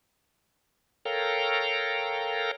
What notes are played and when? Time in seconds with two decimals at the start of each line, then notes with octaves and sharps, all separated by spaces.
1.05 A4 A#4 C#5 F5 G5 A#5